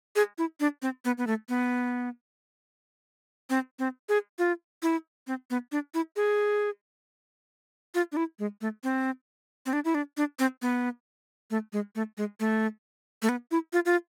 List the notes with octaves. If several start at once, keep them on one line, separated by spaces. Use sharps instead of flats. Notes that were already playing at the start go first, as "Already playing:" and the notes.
G#4
E4
D4
C4
B3
B3
A3
B3
C4
C4
G#4
F4
E4
C4
B3
D4
E4
G#4
F4
D4
E4
G#3
A3
C4
C4
D4
E4
D4
D4
C4
B3
A3
G#3
A3
G#3
A3
A3
B3
E4
F4
F4